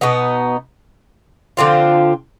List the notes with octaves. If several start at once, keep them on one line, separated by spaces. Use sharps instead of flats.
B2 B3 D#4
D3 F3 C4 F4